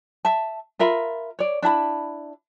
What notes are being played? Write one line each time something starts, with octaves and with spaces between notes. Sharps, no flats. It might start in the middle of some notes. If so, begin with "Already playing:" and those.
E5 A5
F4 A#4 E5 B5
C#5 D5
D4 E4 A5 B5